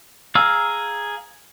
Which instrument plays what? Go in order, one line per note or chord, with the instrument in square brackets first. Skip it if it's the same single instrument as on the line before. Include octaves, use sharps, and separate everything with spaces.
[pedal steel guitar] G#4 F5 A#5 E6 F6